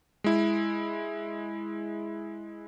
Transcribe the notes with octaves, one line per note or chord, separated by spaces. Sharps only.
G#3 E4